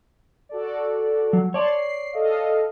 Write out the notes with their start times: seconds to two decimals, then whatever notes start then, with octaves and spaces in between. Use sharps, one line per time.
0.49 F#4 A4 D5
1.33 F#3
1.54 C#5 D5 A5 C6
1.71 C7
2.13 A4 D#5 F5